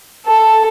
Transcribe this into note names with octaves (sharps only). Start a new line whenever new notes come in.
A4